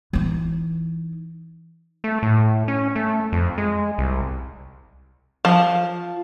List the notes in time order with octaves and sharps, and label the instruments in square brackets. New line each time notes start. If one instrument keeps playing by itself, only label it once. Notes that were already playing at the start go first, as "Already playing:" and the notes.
[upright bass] E3 D#4
[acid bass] A3
A2
C#4
A3
F2
G#3
C2
[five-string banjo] F3